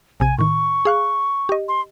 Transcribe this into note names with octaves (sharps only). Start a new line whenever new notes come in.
A#1 C3 G#5 G#6
A2 D#3 C#6
G#4 F5 F#6
G4 D#5
C6